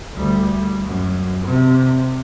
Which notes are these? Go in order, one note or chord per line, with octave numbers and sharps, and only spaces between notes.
D2 G3
F#2
C3